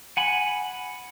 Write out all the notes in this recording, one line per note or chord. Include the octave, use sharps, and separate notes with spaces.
F#5 G#5 B5